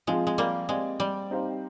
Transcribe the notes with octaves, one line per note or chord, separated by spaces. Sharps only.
F3 G#3 C4 F4 G#4
G#3
G3 A#3
G#3 C4 G4 D5 F5
G3
C4 D#4 G4 C5 F5